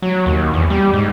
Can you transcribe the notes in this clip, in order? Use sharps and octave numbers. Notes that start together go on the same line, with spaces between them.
F#3
D#2
E2
G3
G#2